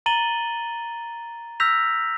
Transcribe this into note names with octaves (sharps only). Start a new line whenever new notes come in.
A#5 A6 D#7 F#7 G7
E6 F6 G6 A#6 B6 F7